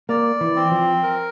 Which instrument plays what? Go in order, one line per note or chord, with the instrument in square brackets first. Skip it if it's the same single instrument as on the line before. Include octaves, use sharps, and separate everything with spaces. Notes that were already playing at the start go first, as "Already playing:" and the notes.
[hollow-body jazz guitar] A#3 [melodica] D5
[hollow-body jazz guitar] E3
[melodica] C4
[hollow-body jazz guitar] F3
[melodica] A#4